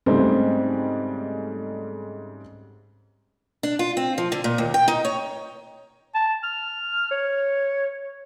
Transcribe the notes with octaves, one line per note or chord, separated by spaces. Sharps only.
G#2 C#3 G3 A3 C4
D4
F4
C4
F3
D3
A#2
D#2
G5
D#4
C#5
A5
F6
C#5